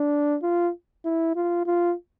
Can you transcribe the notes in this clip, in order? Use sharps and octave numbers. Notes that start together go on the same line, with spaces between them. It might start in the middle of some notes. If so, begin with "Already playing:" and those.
Already playing: D4
F4
E4
F4
F4